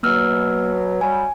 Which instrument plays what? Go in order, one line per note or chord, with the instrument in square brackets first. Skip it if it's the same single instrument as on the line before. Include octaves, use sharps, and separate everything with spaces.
[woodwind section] B2 F#3 [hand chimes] A#3 E6 F6
[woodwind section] F#3 G3 [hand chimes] G#5